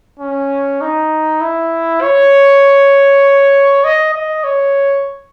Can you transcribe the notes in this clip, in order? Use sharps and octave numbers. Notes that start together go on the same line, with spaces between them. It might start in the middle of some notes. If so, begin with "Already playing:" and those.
C#4
D#4
E4
C#5
D#5
D#5
C#5